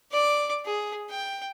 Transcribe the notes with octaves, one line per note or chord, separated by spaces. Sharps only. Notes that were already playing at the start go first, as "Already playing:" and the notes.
D5 D6
G#4
G5